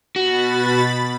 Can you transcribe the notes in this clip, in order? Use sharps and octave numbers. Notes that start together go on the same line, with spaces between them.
B2 F#4 B5 A6